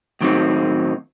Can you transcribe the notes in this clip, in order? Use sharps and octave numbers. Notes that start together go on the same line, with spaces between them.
A2 D#3 F#3 B3 C4 D#4